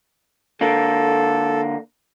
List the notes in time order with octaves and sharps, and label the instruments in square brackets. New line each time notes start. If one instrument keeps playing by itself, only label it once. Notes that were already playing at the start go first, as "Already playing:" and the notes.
[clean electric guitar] D3 A#3 [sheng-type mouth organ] A4